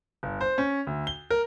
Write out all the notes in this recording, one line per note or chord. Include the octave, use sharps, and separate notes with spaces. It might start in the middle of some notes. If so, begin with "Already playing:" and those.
G1
C5
C#4
D2
G7
A#4